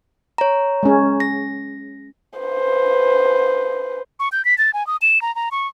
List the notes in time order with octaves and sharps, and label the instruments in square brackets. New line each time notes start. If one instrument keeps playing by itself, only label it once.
[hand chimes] C#5 A#5
[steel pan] G#3 C#4
[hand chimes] A#6
[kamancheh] B4 C5
[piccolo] C#6
G6
B6
A6
G#5
D#6
E7
A#5
A#5
C#6